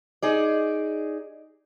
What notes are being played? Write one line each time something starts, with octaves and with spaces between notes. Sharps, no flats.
D#4 G#4 D5